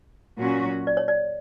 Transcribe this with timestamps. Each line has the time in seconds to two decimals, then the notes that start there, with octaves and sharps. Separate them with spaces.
0.38 A#2 F#3 C#4 F#4
0.87 D5
0.97 C#5
1.08 D5